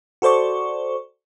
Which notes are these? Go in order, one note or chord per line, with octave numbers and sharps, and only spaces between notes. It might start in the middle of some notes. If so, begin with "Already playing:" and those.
F#4 A4 C5 D5 C#6